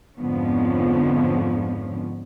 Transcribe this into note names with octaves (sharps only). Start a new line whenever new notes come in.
F2 G#2 D3 F3 B3 C#4